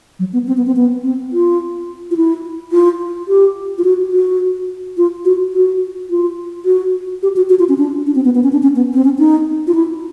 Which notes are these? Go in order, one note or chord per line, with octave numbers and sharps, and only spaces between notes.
F#3
B3
C4
B3
C4
B3
C4
F4
F4
E4
F4
G4
F4
F#4
F#4
F4
F#4
F#4
F4
F#4
G4
F#4
F#4
F4
C#4
D4
D4
C4
B3
B3
C#4
D4
C#4
B3
C4
C#4
D#4
F4
E4